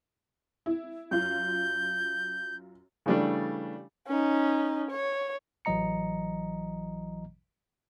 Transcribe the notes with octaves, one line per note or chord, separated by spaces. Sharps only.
E4
F#2 F4 G6
C#3 E3 G3 A3 D4
C#4 D#4
C#5
A1 E3 F#3 D#5 A#5 C#7